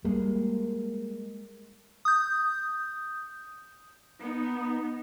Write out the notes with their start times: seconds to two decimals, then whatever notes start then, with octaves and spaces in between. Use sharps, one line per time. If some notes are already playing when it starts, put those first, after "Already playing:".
0.05 G3 G#3 A#3
2.05 D#6 G6
4.20 B3 D#4